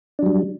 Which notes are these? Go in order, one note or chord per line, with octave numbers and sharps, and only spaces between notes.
F#3 G3 D4